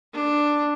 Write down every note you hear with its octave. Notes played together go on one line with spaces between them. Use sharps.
D4